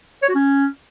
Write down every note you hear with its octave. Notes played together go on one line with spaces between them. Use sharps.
C#5
F#4
C#4